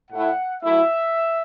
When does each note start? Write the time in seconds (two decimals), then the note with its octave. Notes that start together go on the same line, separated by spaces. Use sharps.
0.10 A2 A3 E4 F#5
0.62 F#3 A3 E4 E5